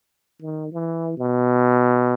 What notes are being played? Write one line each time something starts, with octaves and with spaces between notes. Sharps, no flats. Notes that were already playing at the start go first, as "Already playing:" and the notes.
D#3
E3
B2